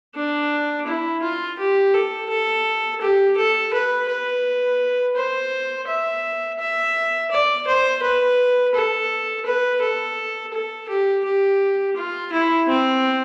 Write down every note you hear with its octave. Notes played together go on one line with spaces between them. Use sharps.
D4
E4
F4
G4
A4
A4
G4
A4
B4
B4
C5
E5
E5
D5
C5
B4
A4
B4
A4
A4
G4
G4
F4
E4
C4